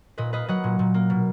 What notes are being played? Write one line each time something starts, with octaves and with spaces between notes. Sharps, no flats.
A#2 B4 D#5
A#3 B4 D#5
F#3 D#5 F#5
A#2
A#2
A#3
B2